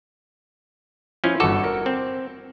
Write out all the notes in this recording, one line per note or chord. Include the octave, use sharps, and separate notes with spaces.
F3 C#4 E4
G1 F#4 A4 D6
A#4
C4